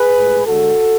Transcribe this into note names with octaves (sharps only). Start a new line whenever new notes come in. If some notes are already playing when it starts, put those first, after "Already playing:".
Already playing: G#4 B4
A2 G#3
D3 G#3 F#4 A4